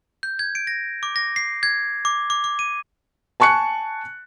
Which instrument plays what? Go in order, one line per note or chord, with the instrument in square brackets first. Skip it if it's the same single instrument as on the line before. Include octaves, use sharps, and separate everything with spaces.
[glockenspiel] G6
G#6
D7
A#6
D6
A#6
C7
G#6
D6
D6
D6
D#7
[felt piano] G#5 A5 C#6 F#6 C#7